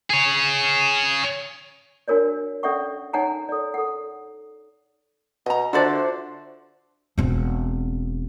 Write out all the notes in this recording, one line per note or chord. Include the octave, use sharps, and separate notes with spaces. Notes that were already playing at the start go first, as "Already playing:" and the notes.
G#4 C#5
D4 F#4 A#4 C#5 D5
C#4 A4 D5 E5 F#5 C#6
D#4 C#5 F#5 G#5 A#5
A4 D5
A4 F#5
B2 D#5 A#5
D3 D4 F4 F#4 C5 D5 E5
E1 C4